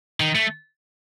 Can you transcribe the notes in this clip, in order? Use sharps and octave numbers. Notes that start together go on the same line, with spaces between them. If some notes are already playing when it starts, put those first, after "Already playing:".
D#3
A3